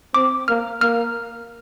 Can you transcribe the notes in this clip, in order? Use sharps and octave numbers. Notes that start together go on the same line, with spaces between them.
C4 D6
A#3 F6
A#3 F6